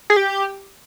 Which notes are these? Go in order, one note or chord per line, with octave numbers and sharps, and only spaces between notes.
G#4
G4